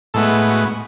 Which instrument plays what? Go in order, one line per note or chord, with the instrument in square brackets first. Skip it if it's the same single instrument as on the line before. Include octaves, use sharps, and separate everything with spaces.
[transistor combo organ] A2 G#3 B3 A4
F#4